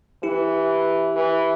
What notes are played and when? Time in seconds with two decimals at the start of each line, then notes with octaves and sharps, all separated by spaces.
0.23 E3 E4 G4
1.16 E3